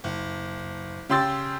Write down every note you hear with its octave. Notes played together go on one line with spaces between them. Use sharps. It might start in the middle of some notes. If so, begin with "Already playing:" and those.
F#1
C#3 G4 C6 E6 A6